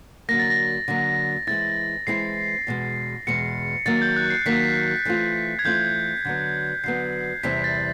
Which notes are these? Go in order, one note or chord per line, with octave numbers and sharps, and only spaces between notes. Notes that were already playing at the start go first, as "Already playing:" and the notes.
D3 F#3 A#3 A#6
A6
A#6
D3 F#3 A#3
E3 G#3 C4 E4 A6
E3 G#3 C4 E4 C7
E2 B2 G#3
E2 B2 G#3 C#7
D#3 F#3 A#3 A6
G6
F#6
C7
D#3 F#3 A#3 B6
E3 A3 C4 F4
G#6
E3 A3 C4 F4 G6
D3 F#3 B3
D3 F#3 B3 C7
E2 C3 E3 G3 C4 B6
A6